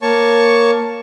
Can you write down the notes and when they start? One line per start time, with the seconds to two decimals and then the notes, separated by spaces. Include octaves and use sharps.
0.02 A#3 C#5 A5 C#6